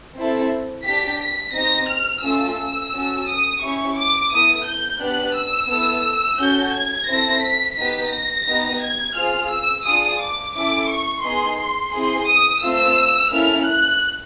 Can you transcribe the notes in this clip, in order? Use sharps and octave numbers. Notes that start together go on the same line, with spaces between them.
C4 E4 A4
D4 G4 B6
B6
C4 D#4 G4 A#6
F6
A3 C#4 F4 A4 E6
C#4 F#4 A4
D#6
C#4 E4 G4 C#6
D6
B3 E4 A4 D#6
G6
B3 D4 G4 F#6
E6
B3 E4 A4
C#4 F#4 A4 G6
G#6
C4 E4 A4 A#6
B6
B3 D#4 G4 B6
A#6
B3 D#4 G4
G#6
C4 F4 G#4 F6
E6
D4 F4 G#4 D#6
D6
C#4 E4 A4 D6
C#6
B3 D#4 G#4 C6
C4 E4 G#4 C6
D#6
A3 C4 F4 E6
A#3 C#4 E4 A4 F6
F#6